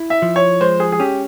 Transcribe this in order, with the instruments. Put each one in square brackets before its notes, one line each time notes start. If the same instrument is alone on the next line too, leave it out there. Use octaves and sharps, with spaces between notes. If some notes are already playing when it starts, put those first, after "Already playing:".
Already playing: [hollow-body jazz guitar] E4
[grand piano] E5
[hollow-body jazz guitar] F3
[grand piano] C#5
[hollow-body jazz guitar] G#3 [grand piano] C5
[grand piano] G#4
G#4
[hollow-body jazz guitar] C#4 [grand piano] G4